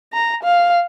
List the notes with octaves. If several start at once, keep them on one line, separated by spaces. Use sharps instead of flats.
A#5
F5